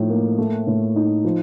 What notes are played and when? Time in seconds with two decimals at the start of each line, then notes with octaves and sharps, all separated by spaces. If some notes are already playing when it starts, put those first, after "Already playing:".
Already playing: A2 F3 D#4
0.09 A#3
0.38 A3
0.67 A2
0.96 D#4
1.24 F3